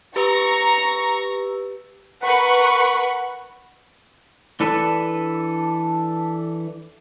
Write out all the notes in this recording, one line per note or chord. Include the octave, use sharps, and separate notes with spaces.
G4 B4 A#5 C#6 E6
A#4 B4 F#5 B5 C#6
E3 D4 A4 B4